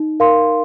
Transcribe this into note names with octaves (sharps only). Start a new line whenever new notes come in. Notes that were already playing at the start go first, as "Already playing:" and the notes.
Already playing: D#4
A#4 F5 C6